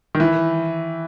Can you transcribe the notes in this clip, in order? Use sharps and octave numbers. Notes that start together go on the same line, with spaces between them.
D#3
E3